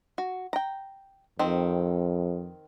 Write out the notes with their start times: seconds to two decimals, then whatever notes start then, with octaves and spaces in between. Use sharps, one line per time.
0.18 F#4
0.53 G5 A#5
1.39 F2 D#3 C4